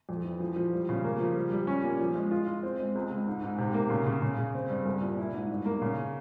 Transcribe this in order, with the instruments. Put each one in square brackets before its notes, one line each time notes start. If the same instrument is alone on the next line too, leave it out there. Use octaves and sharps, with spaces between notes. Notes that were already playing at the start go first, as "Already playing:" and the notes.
[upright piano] F2
E3
F3
F3
G3
C#3
A#3
F3
G3
G3
C#4
A#2
F3
G#3
F4
F4
C4
G#3
C#2
C#2
G#2
G#2
C3
A#3
C#3
C#3
C#3
C#3
C4
G2
C2
A#2
E4
G#2
G2
A#3
C#3